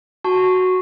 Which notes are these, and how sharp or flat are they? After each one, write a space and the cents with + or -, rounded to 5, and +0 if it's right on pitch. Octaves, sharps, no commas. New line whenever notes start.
F#4 +0 A5 +0 C#6 -5